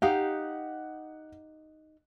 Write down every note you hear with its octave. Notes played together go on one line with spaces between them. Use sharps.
D#4 G4 F5 F#5